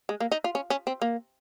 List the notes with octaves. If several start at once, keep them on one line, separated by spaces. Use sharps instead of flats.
G#3
A#3
D#4
F4
C#4
C#4
C4
A#3